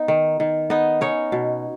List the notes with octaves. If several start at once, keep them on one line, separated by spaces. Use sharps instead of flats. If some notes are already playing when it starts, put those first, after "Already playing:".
Already playing: B3 D#4
D#3
D#3
B3 D#4 D#5
C#4 D#4 C#5
B2